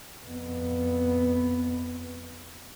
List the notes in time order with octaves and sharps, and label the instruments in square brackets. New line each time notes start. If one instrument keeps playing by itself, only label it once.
[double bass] F2 B3